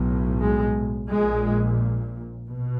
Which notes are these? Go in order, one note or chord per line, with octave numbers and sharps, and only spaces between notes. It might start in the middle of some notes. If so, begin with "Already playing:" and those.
Already playing: B1 A2
G#3
A#1 A#2 G#3
B2